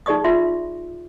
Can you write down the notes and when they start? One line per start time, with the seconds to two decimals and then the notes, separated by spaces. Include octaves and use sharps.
0.06 D#4 G#4 D5 C#6 D#6
0.24 F4 E5 C6